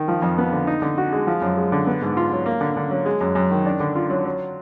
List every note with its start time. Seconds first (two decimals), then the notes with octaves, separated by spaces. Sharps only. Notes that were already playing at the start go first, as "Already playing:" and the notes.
Already playing: D#3
0.08 F3
0.22 F2
0.38 B3
0.52 D3
0.67 D#4
0.82 D3
0.98 F#4
1.13 G#3
1.27 F3
1.41 F#2
1.57 G#3
1.72 D3
1.87 B3
2.02 G#2
2.17 F4
2.32 F#3
2.46 A#3
2.61 D3
2.77 D3
2.91 F#3
3.06 G#3
3.21 F#2
3.35 F#2
3.51 D#3
3.66 D4
3.80 D3
3.95 F4
4.10 F#3
4.25 F#3